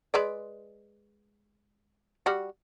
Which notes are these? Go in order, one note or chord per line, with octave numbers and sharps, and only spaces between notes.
G#3 B4 D5
G3 F#4